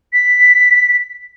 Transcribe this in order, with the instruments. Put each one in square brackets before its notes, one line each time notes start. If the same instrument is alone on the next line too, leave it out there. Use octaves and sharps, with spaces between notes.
[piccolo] B6